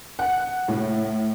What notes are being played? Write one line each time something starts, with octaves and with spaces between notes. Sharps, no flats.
F#5
A2